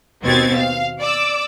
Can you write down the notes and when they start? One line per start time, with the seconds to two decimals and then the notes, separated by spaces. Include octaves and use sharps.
0.23 D#2 B2 C4 G#6 A6
0.55 F5
1.00 D5 D6 E6